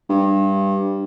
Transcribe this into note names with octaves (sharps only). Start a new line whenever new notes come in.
G2